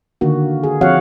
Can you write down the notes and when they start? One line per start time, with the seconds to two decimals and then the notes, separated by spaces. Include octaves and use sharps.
0.21 D3 D#3 A#3 F#4
0.64 G#4
0.81 F3 C4 F#4 C#5 F5 F#5